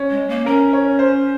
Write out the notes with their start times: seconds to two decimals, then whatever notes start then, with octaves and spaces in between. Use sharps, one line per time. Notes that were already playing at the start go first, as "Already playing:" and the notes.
Already playing: C#4
0.10 G#3
0.29 A#3
0.46 C#4 A#4
0.73 C#5
0.99 C5